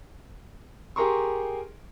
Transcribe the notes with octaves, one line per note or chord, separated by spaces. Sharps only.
G4 G#4 A#4 A#5 C6 C#6